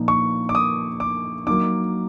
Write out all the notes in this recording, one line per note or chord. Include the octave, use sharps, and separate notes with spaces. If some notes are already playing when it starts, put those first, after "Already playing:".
Already playing: A#2 F3 A#3 D#4
C#6
D6
D#6
D6
F#3 A#3 D#4 D6